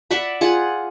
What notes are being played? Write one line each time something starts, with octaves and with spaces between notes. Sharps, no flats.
D5 E5 F#5 B5
F4 G#4 F#5